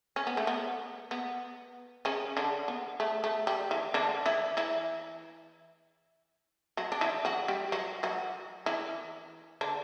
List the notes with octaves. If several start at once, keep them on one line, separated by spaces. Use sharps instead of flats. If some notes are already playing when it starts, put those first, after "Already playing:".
C#4
B3
A3
B3
B3
C#3 C#4
D3 D4
B3
A3
A3
G3
E3
D3 D4
E3 E4
E3 E4
F#3 F#4
D4
E3 E4
F#3 F#4
G3 G4
F#3 F#4
F#3 F#4
E3 E4
D3 D4